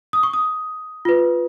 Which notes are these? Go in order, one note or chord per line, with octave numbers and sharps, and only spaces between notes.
D#6
C#6
D#6
F4 B4